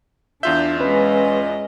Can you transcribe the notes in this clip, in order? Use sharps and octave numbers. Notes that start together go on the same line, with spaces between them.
E2 D4 F4 E5 G6
G#3 C#4 B4 D#5